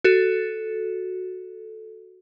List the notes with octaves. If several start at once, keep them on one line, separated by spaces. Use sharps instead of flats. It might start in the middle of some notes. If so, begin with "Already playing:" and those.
F#4 A4